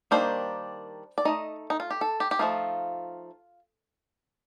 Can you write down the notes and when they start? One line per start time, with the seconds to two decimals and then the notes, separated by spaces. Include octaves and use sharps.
0.11 D#3 G3 A#3 D4 C5
1.18 D5
1.25 A3 D#4 D#5
1.70 D#4
1.80 F4
1.90 G4
2.01 A4
2.20 G4
2.31 G4
2.39 F3 A3 D#4 F4